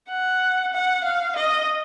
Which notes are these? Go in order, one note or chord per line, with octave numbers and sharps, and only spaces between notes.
F#5
F#5
F5
D#5